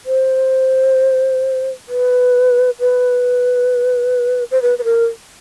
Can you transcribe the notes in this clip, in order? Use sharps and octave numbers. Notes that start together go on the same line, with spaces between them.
C5
B4
B4
C5
B4
B4
A#4